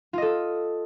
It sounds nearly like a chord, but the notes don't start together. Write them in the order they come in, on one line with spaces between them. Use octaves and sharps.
F4 D#5 A4